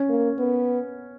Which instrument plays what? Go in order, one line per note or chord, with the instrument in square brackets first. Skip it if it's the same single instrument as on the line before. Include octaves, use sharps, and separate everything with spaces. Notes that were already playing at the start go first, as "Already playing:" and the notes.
Already playing: [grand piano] C#4
[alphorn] A#3
B3